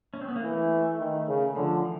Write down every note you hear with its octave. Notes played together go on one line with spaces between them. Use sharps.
C#4
C4
B3
A#3
E3 A3
D#3
C#3
D3 F3
E3